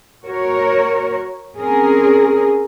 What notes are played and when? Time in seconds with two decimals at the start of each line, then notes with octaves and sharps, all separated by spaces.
0.23 F#4 A#4 C#5
1.59 C4 C#4 G#4 A#4